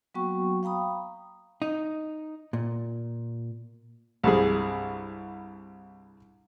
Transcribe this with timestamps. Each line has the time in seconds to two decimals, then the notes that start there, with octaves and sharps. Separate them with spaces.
0.15 F#3 A#3 B3 F#4 G5 C#6
0.63 F5 G5 A#5 B5 D#6
1.62 D#4
2.53 A#2
4.24 C2 G2 G#4